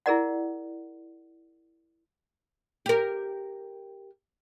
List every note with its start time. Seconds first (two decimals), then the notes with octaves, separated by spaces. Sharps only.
0.06 E4 G#4 A#4 D5 F#5
2.86 G4 A#4